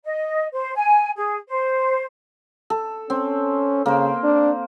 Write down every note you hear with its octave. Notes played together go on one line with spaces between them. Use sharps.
D#5
C5
G#5
G#4
C5
A4
C4 C#4
C#3 A#3 C5
D4